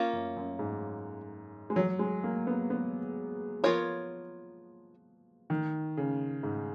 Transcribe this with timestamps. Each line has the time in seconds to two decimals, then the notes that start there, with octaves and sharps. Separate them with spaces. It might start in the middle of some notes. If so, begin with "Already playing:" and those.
Already playing: A#3 C#4 F4
0.13 F#2
0.36 F#2
0.59 G#2
1.70 G#3
1.76 F#3
1.99 G#3
2.24 A#3
2.47 B3
2.70 B3
3.63 F3 B3 F4 A#4 C#5
5.50 D#3
5.97 C#3
6.43 G#2